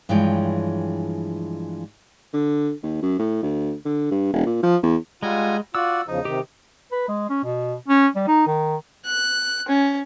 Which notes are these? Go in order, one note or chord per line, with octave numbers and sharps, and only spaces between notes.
G2 E3 F3 G#3 C#5 G5
D3
D#2
F#2
A2
D2
D3
G2
E1
A#2
F3
E2
G3 G#3 F4 F#5 G#5 A#5
F4 F#4 D5 F#5 E6
E2 C#3 F3 D#4
C3 D#3 G4
B4
G#3
C#4
B2
C#4
G3
D#4
D#3
F#6
C#4